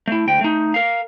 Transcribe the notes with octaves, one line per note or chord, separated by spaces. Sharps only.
A3 E4
D2 G5
A3 D#4
A#4 F5